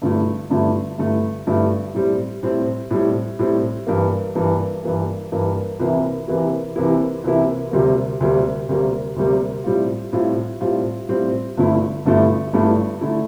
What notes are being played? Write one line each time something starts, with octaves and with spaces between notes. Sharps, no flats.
G2 D3 A3 E4
G2 D3 A3 E4
G2 D3 A3 E4
G2 D3 A3 E4
A2 G3 C4
A2 G3 C4
A2 G3 C4
A2 G3 C4
G2 E3 A#3
G2 E3 A#3
G2 E3 A#3
G2 E3 A#3
C2 C3 E3 A#3 E4
C2 C3 E3 A#3 E4
C2 C3 E3 A#3 E4
C2 C3 E3 A#3 E4
D2 C3 G3 A#3
D2 C3 G3 A#3
D2 C3 G3 A#3
D2 C3 G3 A#3
A2 G3 C4 F4
A2 G3 C4 F4
A2 G3 C4 F4
A2 G3 C4 F4
G1 G2 D3 A3 E4
G1 G2 D3 A3 E4
G1 G2 D3 A3 E4
D3 A3 E4